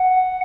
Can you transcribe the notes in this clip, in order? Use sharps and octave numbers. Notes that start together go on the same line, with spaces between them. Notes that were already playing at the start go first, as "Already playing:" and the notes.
Already playing: F#5